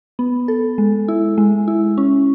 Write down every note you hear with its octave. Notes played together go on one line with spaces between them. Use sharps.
B3
A4
G#3
E4
G#3
E4
C#4